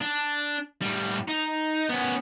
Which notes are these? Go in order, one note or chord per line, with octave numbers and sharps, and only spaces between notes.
D4
A2 G3
D#4
B3 C#4